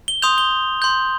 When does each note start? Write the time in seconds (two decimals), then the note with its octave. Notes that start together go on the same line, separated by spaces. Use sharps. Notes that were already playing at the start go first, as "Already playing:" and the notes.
0.08 G7
0.22 C6 D#6 G6 F7
0.38 G7
0.82 C6 G6